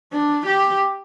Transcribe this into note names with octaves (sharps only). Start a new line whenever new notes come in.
D4
G4